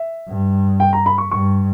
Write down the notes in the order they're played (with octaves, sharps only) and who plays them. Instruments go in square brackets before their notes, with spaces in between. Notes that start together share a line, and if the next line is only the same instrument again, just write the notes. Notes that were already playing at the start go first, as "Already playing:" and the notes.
Already playing: [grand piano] E5
[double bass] G2
[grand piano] G5
A#5
B5
C#6
[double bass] G2 [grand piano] C#6